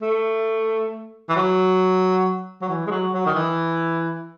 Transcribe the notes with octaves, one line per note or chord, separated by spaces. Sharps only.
A3
E3
F#3
F#3
E3
G#3
F#3
F#3
D#3
E3